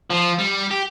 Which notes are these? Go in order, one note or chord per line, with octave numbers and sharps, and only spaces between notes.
F3
G3
G4